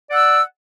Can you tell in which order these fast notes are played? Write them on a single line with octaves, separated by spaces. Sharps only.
D5 F#5 E6